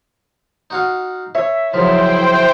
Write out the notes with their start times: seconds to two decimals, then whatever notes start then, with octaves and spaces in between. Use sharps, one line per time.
0.70 D#4 F#4 F5
1.35 C#5 E5
1.73 F#2 C#3 F3 E4 C5 G5